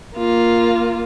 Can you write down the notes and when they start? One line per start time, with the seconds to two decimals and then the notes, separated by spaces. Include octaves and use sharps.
0.16 A#3 F4